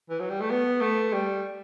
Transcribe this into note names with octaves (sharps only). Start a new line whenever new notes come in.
E3
F#3
G3
A3
B3
A3
G3